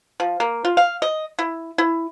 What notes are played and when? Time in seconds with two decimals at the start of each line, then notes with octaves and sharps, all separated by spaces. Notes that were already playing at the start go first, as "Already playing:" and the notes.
0.20 F3
0.40 A#3
0.65 F4
0.77 F5
1.02 D#5
1.39 E4
1.78 E4